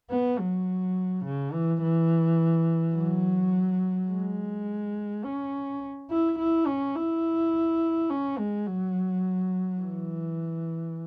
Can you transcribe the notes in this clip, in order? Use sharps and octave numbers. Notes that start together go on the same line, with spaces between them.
B3
F#3
C#3
E3
E3
F#3
G#3
C#4
E4
E4
C#4
E4
C#4
G#3
F#3
E3